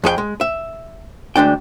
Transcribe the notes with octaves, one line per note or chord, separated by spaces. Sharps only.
F2 G#4 A4 G5
G#3
E5
D2 G#3 D4 G5